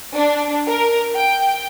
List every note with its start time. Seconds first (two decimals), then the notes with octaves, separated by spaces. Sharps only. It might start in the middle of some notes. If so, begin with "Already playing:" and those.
0.15 D4
0.68 A#4
1.15 G5